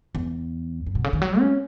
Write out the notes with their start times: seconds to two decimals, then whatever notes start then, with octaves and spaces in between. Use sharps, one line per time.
0.15 E2
0.86 F#2
0.95 B2
1.04 C#3
1.13 D#3
1.22 F#3
1.40 C#4